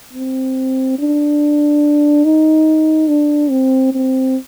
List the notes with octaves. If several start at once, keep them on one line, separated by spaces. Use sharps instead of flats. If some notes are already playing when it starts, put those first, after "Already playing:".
C4
D4
D#4
D4
C4
C4